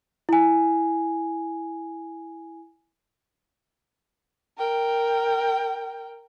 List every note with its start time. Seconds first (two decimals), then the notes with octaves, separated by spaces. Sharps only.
0.29 E4 G#5
4.58 A#4 G5